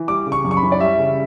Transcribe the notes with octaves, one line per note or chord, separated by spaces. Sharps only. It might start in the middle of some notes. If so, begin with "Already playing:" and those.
Already playing: E3
G3 D6
C#3
C#6
F#2
C#6
B5
E3
D5
G3 E5
C#3